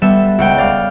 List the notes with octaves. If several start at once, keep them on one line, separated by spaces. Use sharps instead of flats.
G3 B3 A4 E5 E7
C#2 F#5 G5
D5 F5